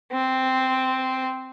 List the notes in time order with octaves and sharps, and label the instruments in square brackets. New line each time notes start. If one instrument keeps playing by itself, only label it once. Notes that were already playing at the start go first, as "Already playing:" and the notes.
[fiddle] C4